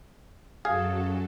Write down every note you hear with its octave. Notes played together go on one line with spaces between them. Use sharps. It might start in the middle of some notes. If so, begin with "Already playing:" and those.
F#2 F#3 G#4 A4 F5